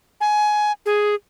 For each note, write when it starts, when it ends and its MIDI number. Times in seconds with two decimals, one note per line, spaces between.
0.21 0.72 80
0.86 1.15 68